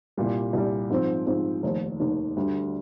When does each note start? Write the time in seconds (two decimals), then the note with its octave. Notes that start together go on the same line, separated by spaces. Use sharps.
0.17 C2 A#2 G3
0.53 C2 A#2 G3
0.90 G#2 F3 C4
1.26 G#2 F3 C4
1.63 F1 D#2 D#3
2.00 F1 D#2 D#3
2.36 D2 D3 G3